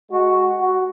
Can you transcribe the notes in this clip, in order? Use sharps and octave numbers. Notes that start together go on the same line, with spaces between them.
G#3 F#4
F#4